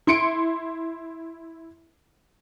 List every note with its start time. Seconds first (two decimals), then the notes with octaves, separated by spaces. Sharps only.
0.07 E4 C6 C#7 D7